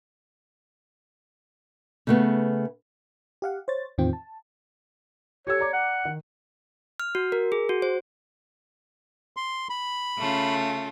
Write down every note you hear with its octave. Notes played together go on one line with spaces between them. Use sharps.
C#3 A3 B3
G4 F5 F#5
C5 C#5 A6
E2 A2 D#3 C4 F4 G5
A5
G4 A4 C#5 E6
D5 A#5 D6
F#5
D#3
F6
F#4
A#4
G#4
F#4
C5
C6
B5
C#3 A3 F4